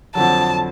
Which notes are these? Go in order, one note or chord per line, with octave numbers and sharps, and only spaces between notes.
F2 D3 F#3 A5